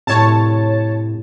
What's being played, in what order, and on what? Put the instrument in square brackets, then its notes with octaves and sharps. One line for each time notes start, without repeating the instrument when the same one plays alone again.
[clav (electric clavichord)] A2 C3 [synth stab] C#5 A5